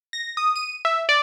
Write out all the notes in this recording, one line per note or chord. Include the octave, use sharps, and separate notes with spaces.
A#6
D#6
D#7
E5
D5